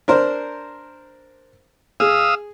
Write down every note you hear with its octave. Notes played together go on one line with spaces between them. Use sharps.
D4 A#4 C5
G#4 F5 D#6 E6